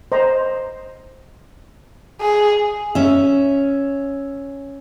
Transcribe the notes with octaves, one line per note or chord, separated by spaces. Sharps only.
C5 D#5 A#5
G#4
C#4 E5